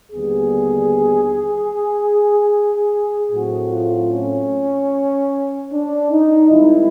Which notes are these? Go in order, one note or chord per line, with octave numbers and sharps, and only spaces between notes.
D#2 D3 G3 B3 G#4
A2 F#3 A3 C4 F#4
F4
C#4
D4
D#4
G#2 D#3 G3 C4 E4